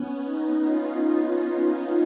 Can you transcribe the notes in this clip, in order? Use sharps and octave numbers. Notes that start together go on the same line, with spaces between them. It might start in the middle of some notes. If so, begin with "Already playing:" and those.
Already playing: B3 C#4
C#4 D#4
D#4 F4